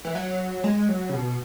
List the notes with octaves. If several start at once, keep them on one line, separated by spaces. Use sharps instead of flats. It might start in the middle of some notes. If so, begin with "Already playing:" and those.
E3
F#3
G#3
F#3
C#3
B2